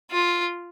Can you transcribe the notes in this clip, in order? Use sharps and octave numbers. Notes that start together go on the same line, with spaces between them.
F4